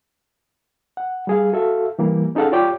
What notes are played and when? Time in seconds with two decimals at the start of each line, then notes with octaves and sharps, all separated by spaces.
0.97 F#5
1.27 G3 G#4 F5
1.53 F#4 A4 E5 F5
1.99 E3 G3 A#3
2.35 C#4 D#4 G#4 A4 F5 F#5
2.52 F4 G4 C#5 D5 G5 D6